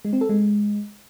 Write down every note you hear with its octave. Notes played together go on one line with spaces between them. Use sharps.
G#3
C4
A4
G#3